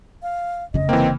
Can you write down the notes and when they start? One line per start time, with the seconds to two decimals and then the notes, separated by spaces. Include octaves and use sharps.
0.23 F5
0.74 F1 C#3 D#5
0.89 E3 A#3 C4